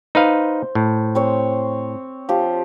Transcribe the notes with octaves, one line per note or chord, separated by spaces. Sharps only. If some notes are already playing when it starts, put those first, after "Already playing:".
D#4 B4 C5 F5
A2
C4 C5 C#5
F3 G4